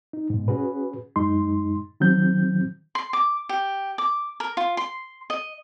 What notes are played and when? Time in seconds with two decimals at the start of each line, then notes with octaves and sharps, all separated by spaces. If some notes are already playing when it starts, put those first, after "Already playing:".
0.13 D#4
0.30 G#2 B2
0.48 C#4 F#4 G#4 B4
1.16 F#2 G#3 D#4 C6
2.00 D#3 F3 F#3 C4 G6
2.95 C6
3.13 D6
3.49 G4
3.98 D6
4.40 A#4
4.57 F4
4.77 C6
5.30 D#5